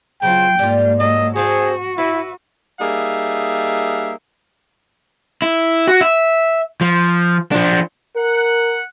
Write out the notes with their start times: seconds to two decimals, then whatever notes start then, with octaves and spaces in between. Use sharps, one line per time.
0.22 C#3 F#3 C4 F4 G5
0.59 G#2 G3 A#3 F4
1.00 F#3 A4 D#5
1.36 C4 F#4 G#4 A4 C5
1.98 E4 B4 E5
2.81 G3 A#3 D#4 G#4 E5 F5
5.42 E4
5.88 F#4
6.01 E5
6.81 F3
7.52 F3 D4
8.16 A#4 F#5